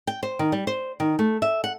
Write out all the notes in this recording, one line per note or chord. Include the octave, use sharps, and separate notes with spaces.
G5
C5
D#3
G3
C5
D#3
A3
E5
F#5